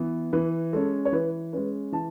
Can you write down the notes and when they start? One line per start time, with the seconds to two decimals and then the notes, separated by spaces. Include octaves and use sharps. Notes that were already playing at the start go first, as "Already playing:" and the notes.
Already playing: E3 B3
0.33 E3 B4
0.73 G#3 C#4 A4
1.05 C#5
1.12 E3 B4
1.53 G#3 C#4 B4
1.92 E3 A5